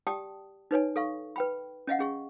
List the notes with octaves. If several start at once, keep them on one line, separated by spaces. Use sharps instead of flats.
G4 D5 G5 A5 D#6
D#4 B4 C#5 G#5
A4 F5 C#6
B4 G5 B5
C#4 D#5 F5 F#5
C#4 G#4 C#6